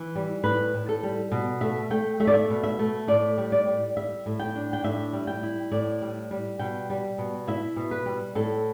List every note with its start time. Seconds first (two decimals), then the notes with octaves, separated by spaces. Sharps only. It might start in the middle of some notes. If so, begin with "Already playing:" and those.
Already playing: E3
0.15 G3
0.44 A2 B4
0.74 A2
0.89 A4
1.03 G3
1.32 B2
1.61 A3 E5
1.90 A3 G5
2.20 A3 E5
2.27 D5
2.34 E5
2.50 B2
2.63 E5
2.79 A3
3.08 A2 D5
3.38 G3
3.52 D5
3.67 G3
3.96 G3 E5
4.26 A2
4.39 G5
4.55 D4
4.73 G5
4.83 A2 E5
5.13 G3
5.27 G5
5.43 E4
5.71 A2 D5
6.02 G3
6.31 G3
6.59 B2 G5
6.90 G3
7.18 B2
7.47 E4 E5
7.76 B2
7.91 B4
8.06 G3
8.35 A2 A4